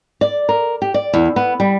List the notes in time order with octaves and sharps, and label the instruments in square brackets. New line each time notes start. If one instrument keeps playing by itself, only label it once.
[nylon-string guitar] D5
A#4
G4
D5
E2
B3
G3